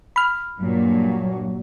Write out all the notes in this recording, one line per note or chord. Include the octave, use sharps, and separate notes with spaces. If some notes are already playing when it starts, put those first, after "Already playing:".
B5 F6
G2 A#2 F#3